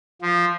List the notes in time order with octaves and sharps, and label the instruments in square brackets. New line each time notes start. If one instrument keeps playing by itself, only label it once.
[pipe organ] F3